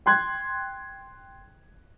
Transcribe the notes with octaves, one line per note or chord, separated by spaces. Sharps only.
G5 C6 F#6 G#6